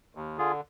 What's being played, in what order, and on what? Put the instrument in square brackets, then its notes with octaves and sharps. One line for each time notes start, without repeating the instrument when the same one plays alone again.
[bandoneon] D#2
D3 F4 G#4